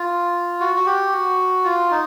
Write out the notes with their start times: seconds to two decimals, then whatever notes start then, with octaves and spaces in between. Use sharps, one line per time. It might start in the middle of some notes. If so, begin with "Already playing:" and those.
Already playing: F4
0.60 F#4
0.76 F#4
0.86 G4
1.12 F#4
1.64 F4
1.91 D#4